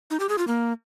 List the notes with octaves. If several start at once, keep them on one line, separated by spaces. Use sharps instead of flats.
D#4
G4
G#4
F4
A#3